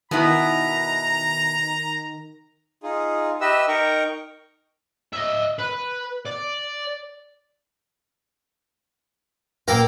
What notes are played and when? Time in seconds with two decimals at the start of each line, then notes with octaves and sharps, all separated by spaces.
0.11 B2 D#3 B3 E4 A#5
2.83 D#4 F4 G#4
3.41 G4 B4 D#5 E5 E6
3.68 D#4 A#4 G5 A#5 C#6
5.13 D#5 E5
5.59 B4
6.26 D5
9.68 A#2 A#3 A4 A#4 G5